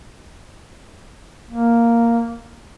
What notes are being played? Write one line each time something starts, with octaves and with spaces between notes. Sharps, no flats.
A#3